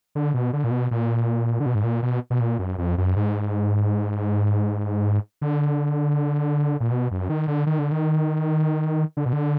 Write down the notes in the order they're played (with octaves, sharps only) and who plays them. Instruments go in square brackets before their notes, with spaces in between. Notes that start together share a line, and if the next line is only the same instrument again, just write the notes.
[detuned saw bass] D3
B2
D3
A#2
B2
A#2
D3
B2
G#2
A#2
B2
B2
A#2
F#2
F2
F#2
G#2
D3
A#2
B2
F#2
D#3
D3
D#3
D3
D#3
D3
B2
D3